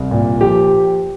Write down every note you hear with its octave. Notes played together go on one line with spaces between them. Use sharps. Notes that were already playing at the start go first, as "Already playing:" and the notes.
Already playing: C2
A#2
F3 G4